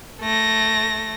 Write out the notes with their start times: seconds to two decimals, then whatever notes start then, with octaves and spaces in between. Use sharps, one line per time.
0.21 A3 A#6